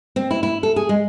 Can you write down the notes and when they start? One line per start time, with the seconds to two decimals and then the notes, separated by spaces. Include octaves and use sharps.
0.16 C4
0.31 E4
0.43 E4
0.63 A4
0.76 G#4
0.89 G#3